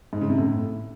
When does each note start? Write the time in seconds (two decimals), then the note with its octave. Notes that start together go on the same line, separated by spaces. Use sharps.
0.13 G#2
0.21 C#3
0.30 C3
0.38 A2